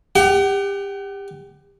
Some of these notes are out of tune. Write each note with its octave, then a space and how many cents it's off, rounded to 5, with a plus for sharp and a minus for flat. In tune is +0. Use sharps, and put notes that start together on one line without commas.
G4 +25 F#5 +45